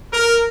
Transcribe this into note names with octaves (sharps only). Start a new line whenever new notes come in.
A#4